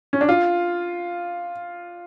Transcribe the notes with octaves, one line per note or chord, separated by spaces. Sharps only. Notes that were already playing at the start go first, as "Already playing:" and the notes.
C#4
D4
F4